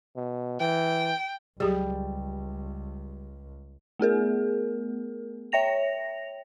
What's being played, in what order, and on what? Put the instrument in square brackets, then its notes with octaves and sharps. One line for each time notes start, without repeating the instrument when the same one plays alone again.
[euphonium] B2
[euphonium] E3 [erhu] G5
[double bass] C#2 [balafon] F#3 G4 G#4 [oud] G3
[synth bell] A3 B3 G#4 A#4
C#5 E5 G5 A#6 F7